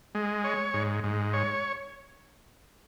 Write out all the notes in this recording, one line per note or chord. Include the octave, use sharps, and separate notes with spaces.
G#3
C#5
G#2
G#2
C#5